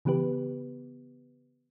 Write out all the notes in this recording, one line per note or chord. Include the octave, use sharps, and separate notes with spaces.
C#3 E3 B3 G4 B4